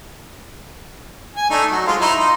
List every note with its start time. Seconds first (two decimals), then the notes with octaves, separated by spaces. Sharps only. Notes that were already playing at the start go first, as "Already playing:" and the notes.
1.36 G#5
1.50 A3 D4 D#4
1.71 F#3
1.87 G#3 F4 C5
2.01 D#4 E4 C6
2.19 D#4